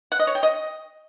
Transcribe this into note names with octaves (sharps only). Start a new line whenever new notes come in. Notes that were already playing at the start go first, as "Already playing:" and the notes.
F#5
D#5
C#5
G5
D#5